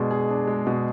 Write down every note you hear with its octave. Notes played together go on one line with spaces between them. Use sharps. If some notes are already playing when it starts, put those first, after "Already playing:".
Already playing: B2 G#3 D4 G#4
G#4
D4
G#3
B2